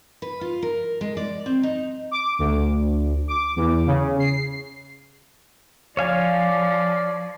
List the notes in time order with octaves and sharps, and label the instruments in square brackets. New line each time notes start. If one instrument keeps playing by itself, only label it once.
[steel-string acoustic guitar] B4
F4
A#4
G#3
D5
C4
D#4
[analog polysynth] D6
D2
D6
E2
C#3
C7
[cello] F3 [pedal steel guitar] C#5 F5 G#5 [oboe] D5